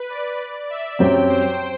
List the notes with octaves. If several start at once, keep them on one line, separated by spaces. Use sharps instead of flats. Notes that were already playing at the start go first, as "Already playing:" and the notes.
Already playing: B4
D5
E5
F#2 F#3 C4 G4 G5
C5